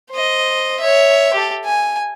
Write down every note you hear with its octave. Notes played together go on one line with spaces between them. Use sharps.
C5 D#5
C#5 E5
G4 A4
G#5